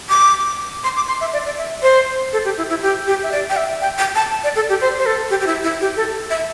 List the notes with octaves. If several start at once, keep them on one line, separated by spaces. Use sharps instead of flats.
D6
C6
D6
C6
E5
D5
D5
E5
C5
A4
G4
E4
E4
G4
G4
E5
D5
G5
E5
G5
G5
A5
D5
A4
G4
C5
C5
A4
G4
G4
E4
E4
G4
A4
E5